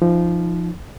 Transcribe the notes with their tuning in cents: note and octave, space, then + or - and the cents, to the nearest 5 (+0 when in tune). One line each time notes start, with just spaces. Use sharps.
F3 -15 D#4 +0